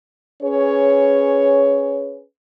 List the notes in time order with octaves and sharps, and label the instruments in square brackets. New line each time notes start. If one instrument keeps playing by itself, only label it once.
[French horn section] C#4 G#4 B4 C#5